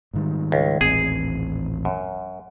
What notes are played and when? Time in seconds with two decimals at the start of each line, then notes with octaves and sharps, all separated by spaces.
0.14 G#2 D#3 G3
0.52 C#2
0.81 D#1 A1 C4 G#4
1.85 F#2